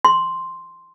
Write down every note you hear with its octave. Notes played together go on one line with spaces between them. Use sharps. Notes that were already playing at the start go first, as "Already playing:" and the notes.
C6